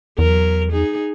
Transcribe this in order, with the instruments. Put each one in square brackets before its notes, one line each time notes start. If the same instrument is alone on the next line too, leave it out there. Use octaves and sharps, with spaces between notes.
[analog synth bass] E2 [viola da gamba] F#3 A#4
[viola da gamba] D#4 G#4